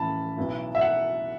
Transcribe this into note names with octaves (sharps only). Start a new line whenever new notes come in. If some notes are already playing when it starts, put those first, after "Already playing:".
Already playing: A2 E3 C#4 E4 A5 B5
B1 B2 B3 E4
E5
F#5